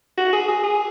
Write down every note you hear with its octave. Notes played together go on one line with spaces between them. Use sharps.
F#4
G#4
G#4
G#4